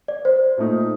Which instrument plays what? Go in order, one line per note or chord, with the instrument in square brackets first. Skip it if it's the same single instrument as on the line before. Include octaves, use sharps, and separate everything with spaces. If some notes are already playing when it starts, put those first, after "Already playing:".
[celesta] D5
C5
[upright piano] A#2 A3 D#4